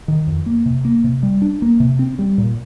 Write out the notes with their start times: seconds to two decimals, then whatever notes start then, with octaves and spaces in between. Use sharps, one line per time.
0.08 D#3
0.27 F2
0.46 A#3
0.66 C3
0.85 A#3
1.04 C3
1.23 G3
1.42 D4
1.62 A#3
1.80 C3
1.99 C4
2.19 G3
2.38 A#2